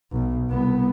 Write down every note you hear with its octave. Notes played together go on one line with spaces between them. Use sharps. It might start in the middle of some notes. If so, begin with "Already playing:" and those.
B1
C2 B3